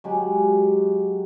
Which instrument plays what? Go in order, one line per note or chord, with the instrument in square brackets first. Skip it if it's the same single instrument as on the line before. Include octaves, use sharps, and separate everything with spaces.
[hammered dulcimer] F#3 G#3 G4